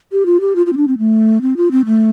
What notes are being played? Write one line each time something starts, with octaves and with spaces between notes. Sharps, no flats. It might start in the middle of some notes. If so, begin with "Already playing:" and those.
G4
F4
G4
F4
F4
C4
D4
C4
A3
C4
F4
C4
A3